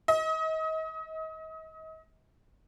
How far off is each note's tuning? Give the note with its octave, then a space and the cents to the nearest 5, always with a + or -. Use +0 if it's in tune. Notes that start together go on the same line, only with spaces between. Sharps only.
D#5 +35